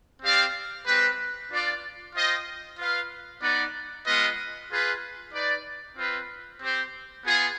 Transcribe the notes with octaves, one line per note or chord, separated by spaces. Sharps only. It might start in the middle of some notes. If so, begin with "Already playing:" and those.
C4 G4 D5 F5
G#3 C4 G4 B4
D4 F4 B4 D5
F4 C5 D#5 G5
F4 B4 F5
B3 D#4 B4 D5
G#3 B3 F4 B4 D#5
F4 G#4 B4
D#4 B4 D5
C4 F4 B4
C4 G4 C5
B3 F4 G#4